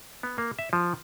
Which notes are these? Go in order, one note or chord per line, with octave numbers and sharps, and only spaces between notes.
B3
A#3
E5
F3